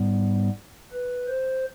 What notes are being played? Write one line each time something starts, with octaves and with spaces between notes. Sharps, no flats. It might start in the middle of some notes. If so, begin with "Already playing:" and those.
Already playing: G#2 G3 B3
B4
C5